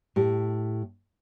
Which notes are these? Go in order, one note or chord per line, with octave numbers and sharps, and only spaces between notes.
A2 G4